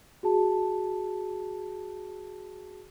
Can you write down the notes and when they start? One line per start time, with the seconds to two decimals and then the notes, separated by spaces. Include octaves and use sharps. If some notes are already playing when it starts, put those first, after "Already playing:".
0.23 F#4 G#4 A5